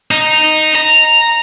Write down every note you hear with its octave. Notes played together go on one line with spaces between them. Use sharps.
D#4
A#5